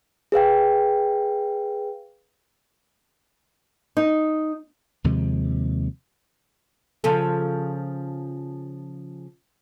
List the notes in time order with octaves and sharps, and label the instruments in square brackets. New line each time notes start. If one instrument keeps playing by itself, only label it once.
[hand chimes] G#4 B4 F5 G5
[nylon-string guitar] D#4
[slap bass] D#2 C3 F3 G#3
[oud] C#3 F3 A4